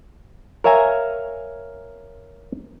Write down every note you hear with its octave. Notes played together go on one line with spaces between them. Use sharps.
A#4 C#5 E5 F5 G#5 A#5